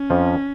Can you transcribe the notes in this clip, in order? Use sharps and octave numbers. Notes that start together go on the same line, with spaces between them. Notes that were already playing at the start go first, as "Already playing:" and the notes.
Already playing: C#4
F2 F3